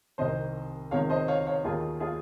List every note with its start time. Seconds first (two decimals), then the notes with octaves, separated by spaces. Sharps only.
0.18 C2 C3 D#3 C5 D#5
0.91 C#2 C3 D#3 C#5 F5
1.09 C5 D#5
1.28 C#5 F5
1.47 C#5 F5
1.64 D#2 D#3 F4 G#4
2.00 F4 G#4